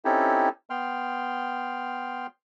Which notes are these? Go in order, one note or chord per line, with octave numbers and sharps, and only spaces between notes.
C4 C#4 D#4 E4 G4 A4
B3 G5 C6 F6